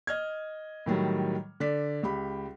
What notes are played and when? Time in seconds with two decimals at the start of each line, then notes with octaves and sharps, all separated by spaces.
0.07 D#5 F6 G#6
0.86 A2 D#3 F#3 G3
1.60 D3 D5 B6
2.03 C#2 G4 B5